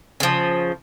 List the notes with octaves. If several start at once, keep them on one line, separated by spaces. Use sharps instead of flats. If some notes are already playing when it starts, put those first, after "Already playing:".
C#3 F3